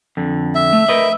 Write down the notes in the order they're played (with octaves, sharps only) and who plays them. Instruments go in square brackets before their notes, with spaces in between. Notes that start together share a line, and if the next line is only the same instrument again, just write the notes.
[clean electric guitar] F2 D3
[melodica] E5
[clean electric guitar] A3
A#4 B4 D#5